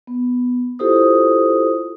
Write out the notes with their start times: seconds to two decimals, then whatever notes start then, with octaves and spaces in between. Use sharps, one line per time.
0.07 B3
0.79 E4 F4 G4 A4 C5 D#6